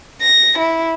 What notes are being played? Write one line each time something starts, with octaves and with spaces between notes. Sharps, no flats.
A#6
E4